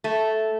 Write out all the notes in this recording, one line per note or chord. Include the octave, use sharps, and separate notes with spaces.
A3